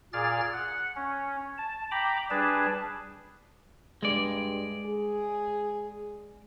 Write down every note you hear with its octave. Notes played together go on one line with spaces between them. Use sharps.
A#2 G#4 D5 F6 A6
F#5
C#4
A5
G5 A#5 B5 D6
G3 D4 G#4 B4 A5
G2 G#3 D5
G#4